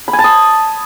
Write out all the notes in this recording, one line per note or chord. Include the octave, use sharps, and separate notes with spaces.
B5
G#5
A5
D#6